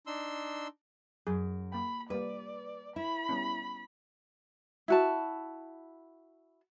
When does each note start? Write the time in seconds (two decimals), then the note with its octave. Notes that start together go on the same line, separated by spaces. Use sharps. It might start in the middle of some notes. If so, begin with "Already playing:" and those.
0.07 D4 D#4 C6 E6
1.27 F#2 G#4
1.72 A#3 G5 B5
2.10 G3 A#3 B4 D5
2.96 E4 B5
3.29 G3 B3 C#4
4.88 E4 F#4 A5